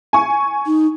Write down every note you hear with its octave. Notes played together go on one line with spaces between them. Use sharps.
G#5 C#6
D#4